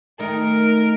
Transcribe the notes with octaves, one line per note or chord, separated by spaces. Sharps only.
D#3 A3 D#4 A#4